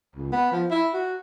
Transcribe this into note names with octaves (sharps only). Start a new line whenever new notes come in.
C#2
B3
F3
E4
F#4